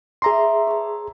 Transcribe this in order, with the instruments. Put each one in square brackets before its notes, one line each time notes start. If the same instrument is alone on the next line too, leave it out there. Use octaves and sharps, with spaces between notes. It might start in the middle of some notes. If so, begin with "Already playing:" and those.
[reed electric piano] G#4 A#5 C6 [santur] D5 E5
[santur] C#5 A5